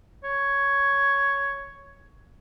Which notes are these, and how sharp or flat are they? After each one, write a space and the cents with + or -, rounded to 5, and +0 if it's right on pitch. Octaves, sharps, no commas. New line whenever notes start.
C#5 +5